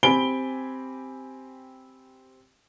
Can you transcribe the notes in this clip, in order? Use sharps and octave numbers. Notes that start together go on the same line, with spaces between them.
C4 G4 G#5 B5 D7 G7